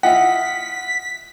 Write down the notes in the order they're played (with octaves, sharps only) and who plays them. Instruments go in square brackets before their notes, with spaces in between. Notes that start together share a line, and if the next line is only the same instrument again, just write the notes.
[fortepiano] E4 F4 D#5 [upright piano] F#5 [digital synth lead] B6